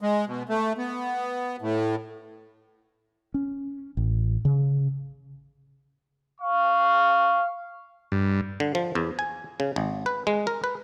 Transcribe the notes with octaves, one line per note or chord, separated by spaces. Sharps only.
G#3
B2
A3
B3
A2
C#4
A1
C#3
F5 C#6
G2
D3
F3
E2
G#5
C#3
G#1
B4
G#3
A#4
B4